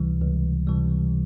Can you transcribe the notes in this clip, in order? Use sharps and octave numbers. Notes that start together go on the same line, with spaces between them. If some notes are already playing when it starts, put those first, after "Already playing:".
Already playing: C#2 C3 E3 G3
C#2
C3 E3 G3